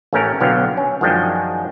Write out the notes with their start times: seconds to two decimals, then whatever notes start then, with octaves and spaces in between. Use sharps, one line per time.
0.13 A1 A3 C#4 A#4 A#5
0.40 B1 D3 F#3 B3 F5 G5
0.77 C#4
1.01 F#2 D#3 F3 G#3 D4 G5